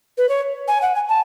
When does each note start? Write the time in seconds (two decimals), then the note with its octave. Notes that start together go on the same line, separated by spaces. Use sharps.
0.17 B4
0.29 C#5
0.68 G#5
0.82 F#5
0.94 G#5
1.08 A5